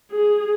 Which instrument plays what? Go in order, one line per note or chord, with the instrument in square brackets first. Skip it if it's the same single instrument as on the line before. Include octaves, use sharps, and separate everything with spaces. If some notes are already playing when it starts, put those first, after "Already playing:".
[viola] G#4